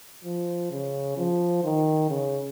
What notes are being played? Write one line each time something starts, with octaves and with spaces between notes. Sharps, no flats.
F3
C#3
F3
D#3
C#3